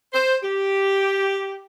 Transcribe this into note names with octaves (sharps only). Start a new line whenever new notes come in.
C5
G4